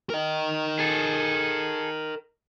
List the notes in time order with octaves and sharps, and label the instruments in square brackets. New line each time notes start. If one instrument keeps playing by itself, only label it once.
[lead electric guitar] A#4 D#5
[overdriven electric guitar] G#4 A4